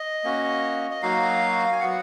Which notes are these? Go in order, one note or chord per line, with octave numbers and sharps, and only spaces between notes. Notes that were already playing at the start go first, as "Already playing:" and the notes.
Already playing: D#5
A#3 C#4 F#4
D#5
F#3 A#3 D#4 F#4 F5
G#5
F#3 B3 F#4 F#5